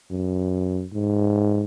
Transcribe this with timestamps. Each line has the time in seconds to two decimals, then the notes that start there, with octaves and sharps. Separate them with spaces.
0.11 F#2
0.93 G#2